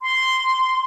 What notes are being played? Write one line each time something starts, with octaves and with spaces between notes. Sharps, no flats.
C6